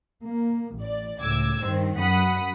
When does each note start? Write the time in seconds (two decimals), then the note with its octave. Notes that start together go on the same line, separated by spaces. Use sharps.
0.25 A#3
0.78 A1 D5
1.22 C#2 A2 D6 E6 G#6
1.64 G2 D#3 C4
1.97 F#2 F#5 B5 D#6 B6